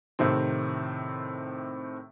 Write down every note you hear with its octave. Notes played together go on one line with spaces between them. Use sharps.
A2 C3 D#3 C4